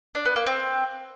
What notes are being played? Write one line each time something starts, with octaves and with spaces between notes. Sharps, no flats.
D4
B3
A#3
C4